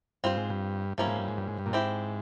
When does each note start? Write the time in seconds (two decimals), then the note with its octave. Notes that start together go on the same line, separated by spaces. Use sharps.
0.24 G2 C4 F4 C5
0.37 G#2
0.50 G2
0.98 G2 F3 A#3 C#4 E4
1.08 G#2
1.18 G2
1.28 G#2
1.38 G2
1.48 G#2
1.59 G2
1.66 A#2
1.73 G#2 C4 E4 G4 C5